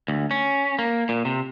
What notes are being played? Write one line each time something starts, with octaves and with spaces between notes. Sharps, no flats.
D2
C#4
A#3
A#2
C3